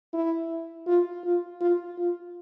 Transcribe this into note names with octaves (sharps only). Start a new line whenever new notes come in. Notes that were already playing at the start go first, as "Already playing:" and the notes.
E4
F4
F4
F4
F4